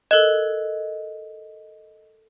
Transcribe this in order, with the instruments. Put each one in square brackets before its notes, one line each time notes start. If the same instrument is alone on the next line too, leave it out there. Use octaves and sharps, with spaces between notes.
[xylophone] A4 A#4 F#6 [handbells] D#5